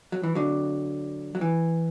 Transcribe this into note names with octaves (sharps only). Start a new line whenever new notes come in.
F#3
E3
D3 F#3
F#3
E3